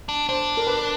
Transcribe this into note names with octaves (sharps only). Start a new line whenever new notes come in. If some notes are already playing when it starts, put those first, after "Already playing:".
D4
D4 C5
A#4
B4